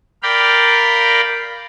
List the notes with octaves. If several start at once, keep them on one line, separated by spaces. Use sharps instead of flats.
A#4 D5 F5 G5 B5